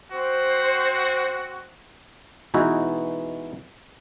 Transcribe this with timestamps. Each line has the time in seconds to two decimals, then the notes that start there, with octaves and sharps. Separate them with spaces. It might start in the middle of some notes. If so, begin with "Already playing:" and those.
0.12 C4 F#4 C5
2.54 B2 E3 G#3 D#4 E4 F#4